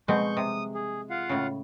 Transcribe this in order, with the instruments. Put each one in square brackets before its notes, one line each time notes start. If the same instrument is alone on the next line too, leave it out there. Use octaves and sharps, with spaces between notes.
[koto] B2 C4 [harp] G#3 [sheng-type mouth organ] C#6 G6
[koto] C3 [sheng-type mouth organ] D#6
[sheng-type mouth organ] G#4
F4 F5 F#5
[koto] A2 C#3